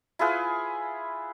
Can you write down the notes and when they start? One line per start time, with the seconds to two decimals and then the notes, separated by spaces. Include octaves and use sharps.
0.19 E4 F4 G#4 B4